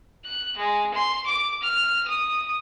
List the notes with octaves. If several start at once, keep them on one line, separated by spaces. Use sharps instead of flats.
F#6
G#3
C6
D6
F6
D#6